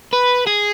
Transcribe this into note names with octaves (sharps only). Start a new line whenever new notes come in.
B4
G#4